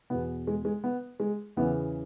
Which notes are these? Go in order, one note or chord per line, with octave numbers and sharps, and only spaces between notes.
E2 B2 B3
G#3
G#3
B3
G#3
E2 C#3 E3 B3